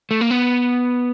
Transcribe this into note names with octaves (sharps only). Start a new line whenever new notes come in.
A3
A#3
B3